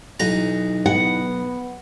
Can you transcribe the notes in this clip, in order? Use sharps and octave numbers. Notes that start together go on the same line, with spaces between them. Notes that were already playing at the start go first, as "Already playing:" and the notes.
B1 E3 D#4 A#5
B3 F#5